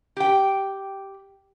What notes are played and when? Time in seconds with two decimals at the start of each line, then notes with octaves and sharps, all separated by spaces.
0.17 G4 G5